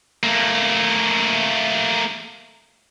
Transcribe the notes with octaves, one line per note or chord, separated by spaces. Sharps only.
A3 A#3